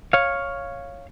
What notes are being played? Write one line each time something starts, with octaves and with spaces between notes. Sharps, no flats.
C#5 F5